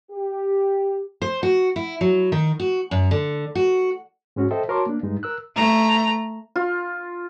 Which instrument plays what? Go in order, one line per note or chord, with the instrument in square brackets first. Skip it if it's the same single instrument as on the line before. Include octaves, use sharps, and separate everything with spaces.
[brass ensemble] G4
[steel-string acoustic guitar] C5
F#4
E4
F#3
D#3
F#4
F#2
D3
F#4
[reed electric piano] G#2 G#3 C#4 F#4
A4 C5 D#5 E5 G5
F#4 A#4 C#5 A5 C6 D6
A#3 D4
G2 G#3 D#4
A#4 E6 F#6
[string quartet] A3 A#5
[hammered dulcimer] F4